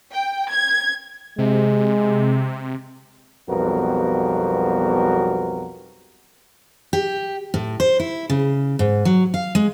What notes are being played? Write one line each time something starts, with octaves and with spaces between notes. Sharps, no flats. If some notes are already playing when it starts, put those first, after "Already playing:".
G5
G#6
C3 G#3
B1 F2 G3 B3 F#4 A#4
G4
A2
C5
E4
C#3
G#2
F#3
F5
G#3